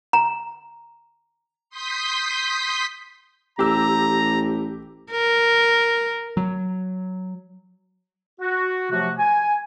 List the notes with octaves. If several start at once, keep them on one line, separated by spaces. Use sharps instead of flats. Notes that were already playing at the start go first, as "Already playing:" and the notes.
A#5
C6 D#6 G6 B6
A1 G4 A#5 E6
A#4
F#3
F#4
C3 F3 F#3 A3 F#4
G#5